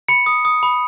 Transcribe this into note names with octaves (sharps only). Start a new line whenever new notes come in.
B5 C#7
D#6
D#6
B5